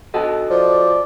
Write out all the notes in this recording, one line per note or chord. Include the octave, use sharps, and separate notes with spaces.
F#4 A4 D#5
F3 D5